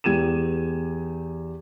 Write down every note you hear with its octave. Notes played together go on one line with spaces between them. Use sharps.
E2 G4 G#6 D#7 E7